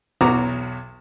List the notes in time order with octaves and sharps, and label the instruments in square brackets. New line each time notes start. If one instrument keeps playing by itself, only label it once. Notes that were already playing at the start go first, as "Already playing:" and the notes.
[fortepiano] B1 E2 F#4 A#5 D6